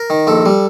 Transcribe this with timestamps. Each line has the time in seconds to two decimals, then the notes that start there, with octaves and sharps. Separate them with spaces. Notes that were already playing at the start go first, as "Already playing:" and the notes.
Already playing: A#4
0.10 D#3
0.27 A#1 A4
0.46 G3